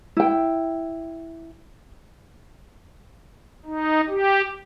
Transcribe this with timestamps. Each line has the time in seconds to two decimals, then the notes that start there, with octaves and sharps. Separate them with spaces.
0.17 E4 G5
3.66 D#4
4.09 G4